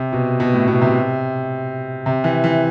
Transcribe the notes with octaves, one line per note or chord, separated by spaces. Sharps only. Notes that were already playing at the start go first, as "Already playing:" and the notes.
Already playing: C3
B2
B2
A2
B2
C3
C3
E3
E3